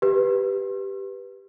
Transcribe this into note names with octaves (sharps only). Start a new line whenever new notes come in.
G4 B4